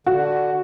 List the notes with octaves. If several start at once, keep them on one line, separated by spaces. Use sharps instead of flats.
D3 F#4